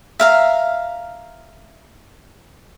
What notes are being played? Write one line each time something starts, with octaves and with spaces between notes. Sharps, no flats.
E5 F5 A#5